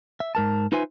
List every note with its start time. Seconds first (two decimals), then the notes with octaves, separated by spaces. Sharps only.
0.20 E5
0.35 G#2 A#4 A5
0.72 D#4 F4 B4 C5 E5 G#5